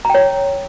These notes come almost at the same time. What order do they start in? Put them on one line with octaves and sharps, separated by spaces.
A#5 G5 C#5